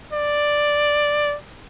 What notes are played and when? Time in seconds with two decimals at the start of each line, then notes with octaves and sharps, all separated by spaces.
0.13 D5